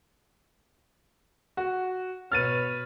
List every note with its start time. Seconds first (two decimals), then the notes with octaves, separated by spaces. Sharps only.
1.57 F#4
2.32 B2 B4 C#5 F6 A6 D#7